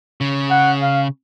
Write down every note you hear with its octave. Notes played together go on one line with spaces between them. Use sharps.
C#3
F#5
F5